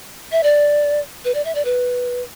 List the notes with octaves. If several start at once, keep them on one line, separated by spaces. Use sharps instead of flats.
E5
D5
B4
D5
E5
D5
B4